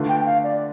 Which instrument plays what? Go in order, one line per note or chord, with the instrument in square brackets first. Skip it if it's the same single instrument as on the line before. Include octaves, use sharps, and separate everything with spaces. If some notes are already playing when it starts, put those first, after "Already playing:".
Already playing: [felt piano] D3 A3 D4 F4 B4
[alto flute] G5
G5
F5
D5